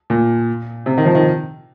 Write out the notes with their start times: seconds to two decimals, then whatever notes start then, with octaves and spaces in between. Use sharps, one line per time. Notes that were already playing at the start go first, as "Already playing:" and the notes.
0.10 A#2
0.86 C3
0.98 D#3
1.06 F3
1.15 D#3